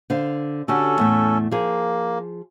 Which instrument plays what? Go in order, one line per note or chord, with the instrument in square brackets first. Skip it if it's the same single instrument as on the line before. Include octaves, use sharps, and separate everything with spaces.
[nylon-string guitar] D3 C5 F5
[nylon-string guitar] D3 F#4 G4 [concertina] C#4 A4
[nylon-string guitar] E2 A2 A3
[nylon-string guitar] F3 G#4 [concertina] A#3